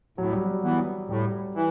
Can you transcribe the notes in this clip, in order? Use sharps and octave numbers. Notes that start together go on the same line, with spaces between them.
A2 F#3
G3
F#3
E3 B3
A2 G3
E3